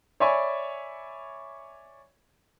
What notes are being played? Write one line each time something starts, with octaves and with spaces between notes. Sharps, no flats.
C#5 D5 E5 G#5 B5 C#6